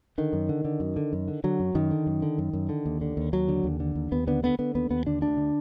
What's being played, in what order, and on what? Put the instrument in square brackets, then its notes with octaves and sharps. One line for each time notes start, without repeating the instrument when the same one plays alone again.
[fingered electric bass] D3 D#3
F#2
D3
D3
F#2
D3
F#2
D3
D3 F#3
F#2
F#2 D#3
D3
F#2
D3
F#2
F#2
D3
D#2
D3
D#2
D#2 F#3
D3
D#2
D3
D#2
D#2 B3
D3 B3
D3 B3
D3 B3
D#2 B3
D#2 B3
D3 D4
D2 D4
D3